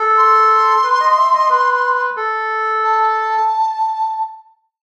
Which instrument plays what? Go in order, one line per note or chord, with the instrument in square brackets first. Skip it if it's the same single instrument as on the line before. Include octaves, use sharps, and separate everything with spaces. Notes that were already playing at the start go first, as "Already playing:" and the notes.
Already playing: [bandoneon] A4
[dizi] C6
[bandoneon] B4
D#5
E5
D#5
B4
A4
[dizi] A5